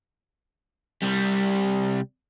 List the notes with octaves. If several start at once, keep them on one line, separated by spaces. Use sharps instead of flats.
C2 G3